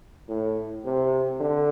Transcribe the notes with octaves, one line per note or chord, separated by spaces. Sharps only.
A2
C3
D3